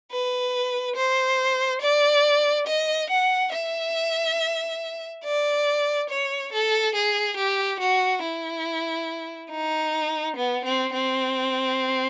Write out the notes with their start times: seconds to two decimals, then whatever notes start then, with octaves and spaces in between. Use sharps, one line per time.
0.12 B4
0.96 C5
1.82 D5
2.67 D#5
3.10 F#5
3.53 E5
5.24 D5
6.10 C#5
6.53 A4
6.95 G#4
7.37 G4
7.80 F#4
8.23 E4
9.51 D#4
10.37 B3
10.65 C4
10.93 C4